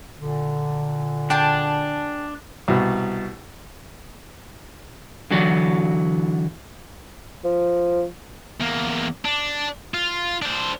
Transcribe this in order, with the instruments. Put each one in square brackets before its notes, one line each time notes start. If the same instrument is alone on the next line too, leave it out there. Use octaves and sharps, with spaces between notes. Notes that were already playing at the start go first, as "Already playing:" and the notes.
[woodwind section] A#2 D3
[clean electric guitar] D4 [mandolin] G#4 G5 A5
[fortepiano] C2 B2
[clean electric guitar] D3 E3 F#3 F#4 D5
[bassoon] F3
[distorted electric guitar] E2 A#3
D4
F4
D4 C5